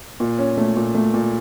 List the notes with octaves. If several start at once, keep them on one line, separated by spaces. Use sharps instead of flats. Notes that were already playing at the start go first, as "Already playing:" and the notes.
A#2
C#4
A3
A#2
A3
A#2